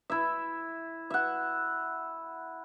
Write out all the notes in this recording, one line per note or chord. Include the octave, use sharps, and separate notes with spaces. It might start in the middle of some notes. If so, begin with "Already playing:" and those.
E4 E5
E5 F#5